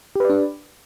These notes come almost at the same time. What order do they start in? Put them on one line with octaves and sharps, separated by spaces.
G4 B4 D5 D4